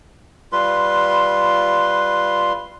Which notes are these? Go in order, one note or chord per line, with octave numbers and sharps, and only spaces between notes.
G3 F4 B4 C6